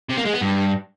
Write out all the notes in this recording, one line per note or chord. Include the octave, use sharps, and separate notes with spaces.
C3
A#3
G#3
B3
G2